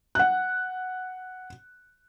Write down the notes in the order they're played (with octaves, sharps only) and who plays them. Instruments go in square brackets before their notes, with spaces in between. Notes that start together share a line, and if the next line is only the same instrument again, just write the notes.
[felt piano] F#5 F#6